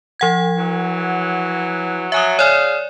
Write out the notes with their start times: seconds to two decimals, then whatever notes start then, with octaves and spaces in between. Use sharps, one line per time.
0.20 F3 F#5 G#6
0.57 E3 F#3
2.12 F#3 E5 G#5 D#6
2.39 G#4 C#5 D5 F5 G#5